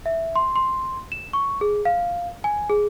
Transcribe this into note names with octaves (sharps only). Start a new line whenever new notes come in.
E5
C6
C6
E7
C#6
G#4
F5
G#5
G#4